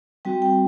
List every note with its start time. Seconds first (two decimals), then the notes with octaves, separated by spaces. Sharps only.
0.25 G3 C4 F#4 G5
0.42 G5